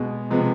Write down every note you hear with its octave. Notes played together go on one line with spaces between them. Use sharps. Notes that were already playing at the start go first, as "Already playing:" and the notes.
Already playing: B2 G#3 B3
C3 F3 G#3 B3